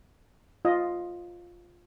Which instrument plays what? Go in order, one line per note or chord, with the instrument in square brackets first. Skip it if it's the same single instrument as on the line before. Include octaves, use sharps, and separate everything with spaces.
[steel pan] F4 D#5